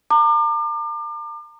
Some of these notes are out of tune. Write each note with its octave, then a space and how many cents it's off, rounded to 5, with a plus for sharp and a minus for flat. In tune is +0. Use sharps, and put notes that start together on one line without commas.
A#5 -35 D6 +35